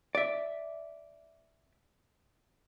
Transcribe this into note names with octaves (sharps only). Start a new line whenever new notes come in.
D5 E5